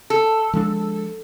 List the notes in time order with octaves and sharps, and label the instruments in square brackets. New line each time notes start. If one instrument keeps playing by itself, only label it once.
[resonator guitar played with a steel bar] A4
[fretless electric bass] F3 G#3 D4